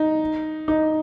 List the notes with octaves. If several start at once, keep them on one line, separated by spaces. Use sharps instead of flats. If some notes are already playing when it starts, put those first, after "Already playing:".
Already playing: D#4
D#4